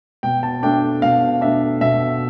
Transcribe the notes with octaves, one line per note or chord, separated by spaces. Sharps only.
B2 G5
A5
A3 D4 G5
B2 F5
A3 D4 E5
B2 E5